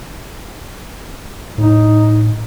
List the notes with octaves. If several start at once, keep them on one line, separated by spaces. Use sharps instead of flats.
A2 D#4